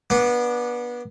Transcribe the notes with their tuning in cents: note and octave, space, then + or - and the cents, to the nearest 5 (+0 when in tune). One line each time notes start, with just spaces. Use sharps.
B3 -25 D4 +0